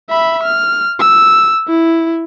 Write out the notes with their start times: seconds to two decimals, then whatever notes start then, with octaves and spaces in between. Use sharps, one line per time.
0.10 E5 B5
0.43 F6
1.00 E6
1.68 E4